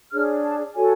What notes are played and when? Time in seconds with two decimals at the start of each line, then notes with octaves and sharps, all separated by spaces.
0.12 D4 G#4 C#5 F6
0.43 A5
0.74 F#4 A4 C#5 G#5